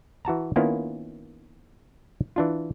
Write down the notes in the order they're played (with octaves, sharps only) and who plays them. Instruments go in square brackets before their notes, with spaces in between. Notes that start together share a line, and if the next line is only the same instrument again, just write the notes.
[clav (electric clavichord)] E3 F#4 A5 A#5
D#3 A#3 B3 C#4 E4 F4
E3 D4 F4